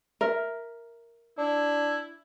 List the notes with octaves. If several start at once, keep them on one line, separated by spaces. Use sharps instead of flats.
A#4 E5
D4 E4